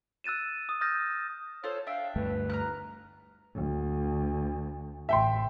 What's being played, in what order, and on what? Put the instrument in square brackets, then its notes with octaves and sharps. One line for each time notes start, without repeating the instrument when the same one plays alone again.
[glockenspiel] E6 F#6 A6 D#7 E7
D#6
D#6 F6 G6 A6 A#6
[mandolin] F4 A4 C5 [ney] C#5
[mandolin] D4 E5 G5 [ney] F5
[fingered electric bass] D2 G2 A3 [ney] B4
[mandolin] A#5 F6 F#6
[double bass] D2
[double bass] A1 A2 [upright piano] E5 G5 C6